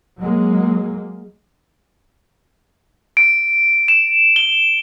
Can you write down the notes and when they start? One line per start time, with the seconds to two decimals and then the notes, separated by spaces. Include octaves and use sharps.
0.19 F#3 G#3 A#3
3.17 D7
3.88 E7
4.36 G7